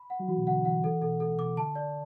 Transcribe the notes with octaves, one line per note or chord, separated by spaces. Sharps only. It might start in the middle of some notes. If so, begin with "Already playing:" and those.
Already playing: B5
F#5
F#3
E3 F#4
B2
D3 F#5
E3 F#5
E3 A4
B2 A4
A2 A4
B2 D6
D3 A5
D5